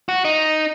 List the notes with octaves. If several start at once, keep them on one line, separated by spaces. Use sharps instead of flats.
F#4
D#4